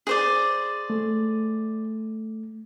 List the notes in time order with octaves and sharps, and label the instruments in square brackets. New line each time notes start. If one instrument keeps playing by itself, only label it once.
[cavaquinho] G#4 C5 D5
[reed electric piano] A3